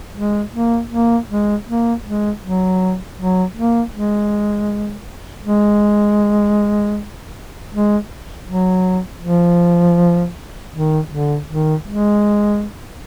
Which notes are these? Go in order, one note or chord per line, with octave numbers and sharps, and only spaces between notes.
G#3
A#3
A#3
G#3
A#3
G#3
F#3
F#3
A#3
G#3
G#3
G#3
F#3
F3
D#3
D3
D#3
G#3